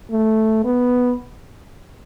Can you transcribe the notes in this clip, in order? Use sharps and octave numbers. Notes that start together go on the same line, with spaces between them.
A3
B3